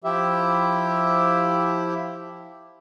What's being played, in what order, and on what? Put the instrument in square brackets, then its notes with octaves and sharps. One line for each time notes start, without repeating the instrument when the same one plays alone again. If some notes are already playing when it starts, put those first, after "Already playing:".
[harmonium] F3 E4 G4 E5